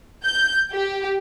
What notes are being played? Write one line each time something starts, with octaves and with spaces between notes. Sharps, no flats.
G6
G4